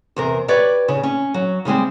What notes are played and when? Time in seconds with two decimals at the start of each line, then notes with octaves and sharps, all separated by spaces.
0.16 E2 C3 A#4
0.48 G4 B4 C#5 D5
0.88 C#3
1.03 C#4
1.34 F#3
1.65 C#3 G3 G#3 C4